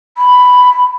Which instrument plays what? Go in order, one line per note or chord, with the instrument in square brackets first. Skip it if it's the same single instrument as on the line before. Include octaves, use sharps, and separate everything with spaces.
[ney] B5